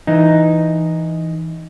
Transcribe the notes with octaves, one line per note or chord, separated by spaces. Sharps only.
E3 D#4